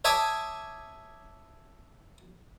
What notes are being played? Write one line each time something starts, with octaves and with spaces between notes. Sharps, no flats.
C#5 E5 G#5 A5 D6 D#6